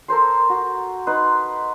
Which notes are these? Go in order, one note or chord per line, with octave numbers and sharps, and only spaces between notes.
A4 A#4 C5 C6
F#4
D#4 B4 C6